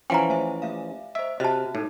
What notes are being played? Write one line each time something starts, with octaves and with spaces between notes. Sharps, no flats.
E3 F3 C#4 F#5 G5 A#5 D7 F#7
A3 C5 E5
A3 E5 F5
C5 D#5 E5
C3 F#4 D#5 E5 A5 F#6
A2 D#4